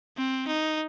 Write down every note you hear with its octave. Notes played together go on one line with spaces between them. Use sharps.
C4
D#4